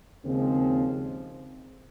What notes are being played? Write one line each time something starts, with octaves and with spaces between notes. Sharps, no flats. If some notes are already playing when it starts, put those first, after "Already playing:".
D#2 C#3 F3 G#3 C4